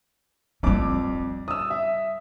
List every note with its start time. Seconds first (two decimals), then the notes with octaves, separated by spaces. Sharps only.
0.63 F2 G3 C#4 D6
1.48 D#6 E6
1.70 E5